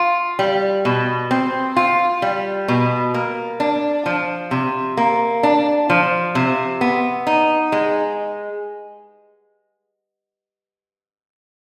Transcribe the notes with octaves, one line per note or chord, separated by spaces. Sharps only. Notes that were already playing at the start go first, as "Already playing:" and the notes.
Already playing: F4
G3
B2
C4
F4
G3
B2
A#3
D4
F3
C3
A#3
D4
F3
C3
B3
D#4
G#3